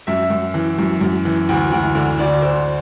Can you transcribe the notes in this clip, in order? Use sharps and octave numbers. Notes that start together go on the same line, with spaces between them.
F#2 E5
F#2
E3
F#2
F#2
E3
D2
D2
D3
D2 D5
D2 C5